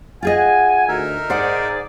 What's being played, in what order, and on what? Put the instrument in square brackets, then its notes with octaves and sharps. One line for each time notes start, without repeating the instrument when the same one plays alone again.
[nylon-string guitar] F4 G#4 D#5 [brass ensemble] F#5 [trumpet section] G#5
[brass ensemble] D2 [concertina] D#4 A#4 E5
[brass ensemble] G#2 [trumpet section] G#4 D5 [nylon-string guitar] C5 F#5